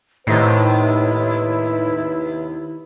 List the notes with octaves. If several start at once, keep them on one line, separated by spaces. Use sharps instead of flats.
D#2 A2 C3 D#4 E4 B4